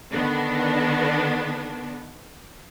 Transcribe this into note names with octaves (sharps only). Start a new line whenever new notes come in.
D3 D#3 B3 D4